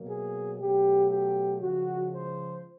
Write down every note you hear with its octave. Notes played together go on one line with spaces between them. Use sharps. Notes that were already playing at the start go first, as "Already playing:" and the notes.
Already playing: B2 F#3 A#3
G#4
B2 F#3 A3 G4
G4
C#3 F3 G#3 F#4
C5